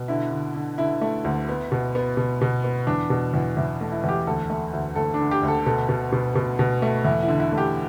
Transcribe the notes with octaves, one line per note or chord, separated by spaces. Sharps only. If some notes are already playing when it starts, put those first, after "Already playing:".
Already playing: B2
D3 E4
D3
D3
D3 E4
A3
D2
B3
B2
B3
B2
B2
B3
E2 D4
B2
E2
E2 E4
A3
E4
E2 G4
D2 A4
A3
D2
D2 A4
D4
D3
G4
D2
A4
B2 A4
B2
B2
B2
B2
A3
E2 E4
E4
D3
E4
A3
G4